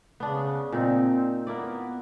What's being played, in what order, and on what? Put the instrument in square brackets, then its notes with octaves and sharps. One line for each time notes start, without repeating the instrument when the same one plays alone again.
[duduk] C#3 [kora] B3 D4
[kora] A#2 D#4 [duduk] C4
[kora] A#3 E4 D5 [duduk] B3